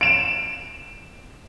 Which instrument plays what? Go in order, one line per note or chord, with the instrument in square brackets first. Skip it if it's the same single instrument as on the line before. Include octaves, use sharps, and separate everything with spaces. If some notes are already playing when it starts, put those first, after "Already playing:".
[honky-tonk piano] D7 E7